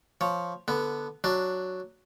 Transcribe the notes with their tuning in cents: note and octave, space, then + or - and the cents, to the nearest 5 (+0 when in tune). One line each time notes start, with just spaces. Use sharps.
F3 +0 C#5 +0
D3 +0 B3 +0
F#3 +0 D4 +0